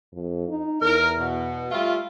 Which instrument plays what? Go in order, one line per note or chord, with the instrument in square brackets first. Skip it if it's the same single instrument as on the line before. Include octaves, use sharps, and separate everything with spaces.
[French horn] F2
D#4
[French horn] E2 [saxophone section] A#4
[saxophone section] B2
G3 A3 F4